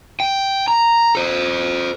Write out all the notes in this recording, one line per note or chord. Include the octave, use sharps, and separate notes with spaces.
G5
A#5
A4 C5